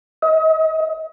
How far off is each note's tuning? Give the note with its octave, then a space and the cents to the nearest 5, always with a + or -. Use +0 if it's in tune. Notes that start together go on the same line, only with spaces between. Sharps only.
D#5 +40